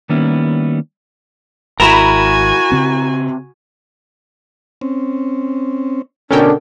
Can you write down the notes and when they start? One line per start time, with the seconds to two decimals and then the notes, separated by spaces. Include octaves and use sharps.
0.09 D#3 G3 A#3 B3 C#4 E4
1.80 G#1 E4 F#4 A#4 G#5 B5 E7 F7
2.72 C#3 C4
4.81 C4 C#4
6.31 B2 D3 C#4 D4 A4 A#4 G5